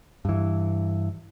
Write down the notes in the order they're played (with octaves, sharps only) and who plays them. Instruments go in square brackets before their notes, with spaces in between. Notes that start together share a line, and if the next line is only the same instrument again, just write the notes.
[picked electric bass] G2 E3